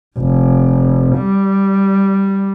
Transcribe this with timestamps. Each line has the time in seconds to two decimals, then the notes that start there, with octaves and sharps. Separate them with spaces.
0.19 F1
1.18 G3